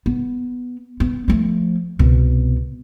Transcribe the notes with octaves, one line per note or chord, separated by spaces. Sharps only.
B3
B3
F3 A3
C2 B2